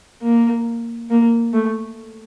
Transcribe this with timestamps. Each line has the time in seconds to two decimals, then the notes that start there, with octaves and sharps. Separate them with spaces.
0.22 A#3
1.10 A#3
1.53 A3